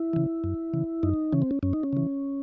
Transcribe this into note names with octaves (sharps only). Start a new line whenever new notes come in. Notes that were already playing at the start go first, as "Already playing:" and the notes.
Already playing: E4
C#3 E3
F#2
C#3 E3
F#2 D#4
C#3 E3 C#4
C4
C#4
F#2 C#4
D#4
C#4
C#3 E3